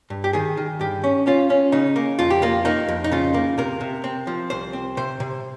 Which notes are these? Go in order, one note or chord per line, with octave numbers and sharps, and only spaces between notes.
G2
G4
D#3 G#4
D#3
G2 G4
C#4
C#4 F4
C#4
C#3 D#4
A#3
F2 F4
G4
A#3 F4
A#3 D#4
F2
D#4
C#3 F4
A#3
C3 A#4
C3
C4
F3
C2 C5
C4
C3 C5
C3